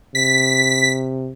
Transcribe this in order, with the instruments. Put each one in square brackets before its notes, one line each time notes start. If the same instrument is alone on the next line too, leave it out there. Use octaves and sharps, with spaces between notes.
[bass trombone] C3 [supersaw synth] B6